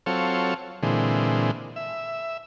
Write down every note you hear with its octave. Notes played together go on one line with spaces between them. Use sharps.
F#3 C4 F4 A4 C#5
A#2 D3 E3 G#3 C4
E5